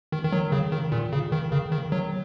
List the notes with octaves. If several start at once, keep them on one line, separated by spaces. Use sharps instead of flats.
D#3
D#3
F#3
C#3
D#3
A#2
C#3
D#3
C#3
D#3
F#3